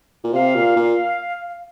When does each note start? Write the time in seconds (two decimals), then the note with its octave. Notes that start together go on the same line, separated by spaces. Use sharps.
0.24 A#2
0.33 C3 F5
0.55 A#2
0.76 A#2